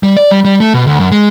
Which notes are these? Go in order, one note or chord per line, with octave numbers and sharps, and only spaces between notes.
G3
D5
G3
G3
A3
B2
D2
F#2
G#3